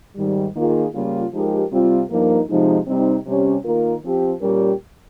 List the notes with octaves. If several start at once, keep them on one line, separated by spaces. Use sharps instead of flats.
G#2 D#3 G3
D#3 A#3 F4 G#4
C#3 G3 A#3 F4
F3 G#3 D#4 G4 A#4
C3 G3 C4 F4
G2 F3 A#3 D#4 A#4
C3 F3 G#3 D#4
C3 G3 C4 D#4
C3 G3 C#4 G4
D#3 A#3 F4 A#4
F3 C4 G4
A#2 G3 C#4 G4 A#4